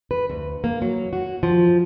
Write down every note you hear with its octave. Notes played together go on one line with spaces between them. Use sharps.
B4
D2
A#3
F#3
F#4
F3